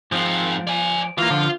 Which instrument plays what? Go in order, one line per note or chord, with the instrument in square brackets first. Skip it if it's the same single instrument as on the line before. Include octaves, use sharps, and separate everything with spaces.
[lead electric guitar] G#2 C4 [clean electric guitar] F3
[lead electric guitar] D5 G#5
[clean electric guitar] E3 A#3 [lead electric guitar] F4
[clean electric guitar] D3 F3